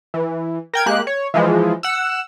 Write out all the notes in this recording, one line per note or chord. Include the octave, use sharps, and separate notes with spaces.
E3
A#4 G5 G#6
G#3 A#3 G4 F#6
C#5
E3 F3 G#3
F#5 E6